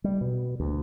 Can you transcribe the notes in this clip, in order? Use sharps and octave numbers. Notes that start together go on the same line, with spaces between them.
G3
B2
D2